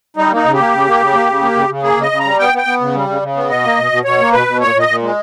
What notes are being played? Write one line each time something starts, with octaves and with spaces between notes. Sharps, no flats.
G3 D#4
A#3 D#4
C#3
G4
A#3
C#3
A#3
C#3
A#3
C#3
A#3
C#3
C#3
A#3 G#4
C#3
D#5
C#3
G3 A#5
B3 G5
B3
G5
B3
C#3
G3
C#3
C#3
B3
B2 D#5
A#3
B2
B2
B2 C#5
A#3
B2 B4
B2
A#2 C#5
A#2 D#5
A#2
G#3